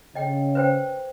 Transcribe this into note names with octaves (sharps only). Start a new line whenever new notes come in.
C#3 D#5 G5
B4 C5 G5